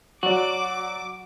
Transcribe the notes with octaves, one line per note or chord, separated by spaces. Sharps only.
F#3 F#4 D5 D6